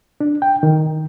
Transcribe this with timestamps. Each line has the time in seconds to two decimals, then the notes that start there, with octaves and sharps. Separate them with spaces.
0.21 D4
0.42 G5
0.63 D#3